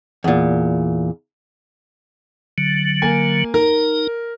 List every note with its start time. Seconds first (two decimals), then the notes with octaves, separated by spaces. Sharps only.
0.24 E2 A#2
2.58 D3 F#3
3.02 A#3 G#5
3.54 D#4 A#4